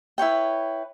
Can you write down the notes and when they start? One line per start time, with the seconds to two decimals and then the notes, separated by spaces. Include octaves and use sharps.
0.18 E4 B4 C#5 G5